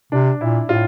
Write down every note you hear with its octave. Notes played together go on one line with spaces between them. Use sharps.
C3 D4
A#2 E4
A2 F4